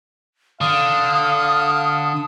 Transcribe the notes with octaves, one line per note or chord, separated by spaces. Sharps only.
D3 F5 D#6